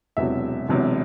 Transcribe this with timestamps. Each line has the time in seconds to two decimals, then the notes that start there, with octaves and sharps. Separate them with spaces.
0.17 E1 E2 C3 F#3 E5
0.69 E1 E2 C3 F#3